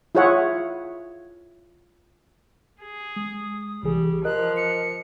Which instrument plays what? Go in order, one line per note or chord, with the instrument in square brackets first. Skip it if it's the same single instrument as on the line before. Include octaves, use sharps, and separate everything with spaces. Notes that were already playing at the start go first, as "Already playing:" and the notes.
[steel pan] E4 F4 G#4 C#5 E5 F#5
[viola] G#4
[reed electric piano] G#3 [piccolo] D#6
[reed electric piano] C2 E3 G#4 [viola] G3
[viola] F3 [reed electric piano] A#4 D#5 [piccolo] F#6
[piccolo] C#7